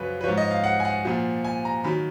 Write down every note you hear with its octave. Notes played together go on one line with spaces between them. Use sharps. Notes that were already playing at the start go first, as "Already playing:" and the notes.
Already playing: F#2 C#3 F3 F4 F#4 B4
B4
G#2 F3 C#5
D#5
F5
F#5
G#5
F#5
A#2 F3
G#5
A#5
D#3 F#3 B5